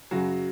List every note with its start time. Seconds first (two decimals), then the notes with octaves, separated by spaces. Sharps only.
0.11 F#2 C#3 F#3 F#4